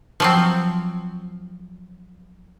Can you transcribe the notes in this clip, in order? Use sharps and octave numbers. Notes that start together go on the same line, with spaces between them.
F3 F#3 C4